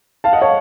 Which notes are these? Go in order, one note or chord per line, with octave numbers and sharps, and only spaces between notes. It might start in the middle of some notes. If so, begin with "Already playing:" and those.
F5 A5
D#5 F#5
C#5 F5